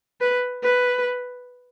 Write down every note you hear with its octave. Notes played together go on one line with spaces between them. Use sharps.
B4
B4